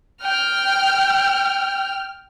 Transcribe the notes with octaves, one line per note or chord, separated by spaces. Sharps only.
G5 F6